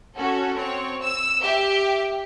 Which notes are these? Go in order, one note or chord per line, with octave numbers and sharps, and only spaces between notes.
C#4 F#4 A4
C4 C#5
E6
G4 E5